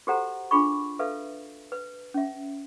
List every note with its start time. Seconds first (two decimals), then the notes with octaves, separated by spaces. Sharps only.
0.07 F#4 G4 A4 C5 F#5 A#5
0.51 D4 F4 G#4 B5 C#6
0.99 A4 B4 E5 F5
1.72 B4
2.14 C#4 E5